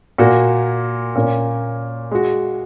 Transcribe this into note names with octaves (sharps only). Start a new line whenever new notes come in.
A#2 A#3 F#4
A#2 A#3 C#4
G#3 F#4